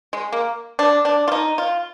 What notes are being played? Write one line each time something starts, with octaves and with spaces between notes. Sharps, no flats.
G#3
A#3
D4
D4
F4
D#4
F4